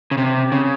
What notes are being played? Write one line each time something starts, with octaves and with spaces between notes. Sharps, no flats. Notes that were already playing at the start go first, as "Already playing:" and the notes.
C#3
C3
C#3